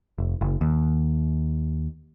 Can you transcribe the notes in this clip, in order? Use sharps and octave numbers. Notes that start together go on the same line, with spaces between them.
F1
F#1
D#2